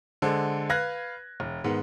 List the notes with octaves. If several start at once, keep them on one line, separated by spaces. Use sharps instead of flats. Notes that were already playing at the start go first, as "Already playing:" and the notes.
D3 G#3 A4 C5
B4 F5 F#6 G#6 A#6
E1
G#2 D#3 B3